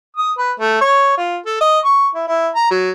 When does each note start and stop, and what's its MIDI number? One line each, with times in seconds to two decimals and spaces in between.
0.17 0.33 87
0.39 0.52 71
0.60 0.80 57
0.81 1.15 73
1.18 1.37 65
1.46 1.56 69
1.61 1.80 75
1.85 2.09 85
2.15 2.24 64
2.28 2.50 64
2.56 2.70 82
2.71 2.91 54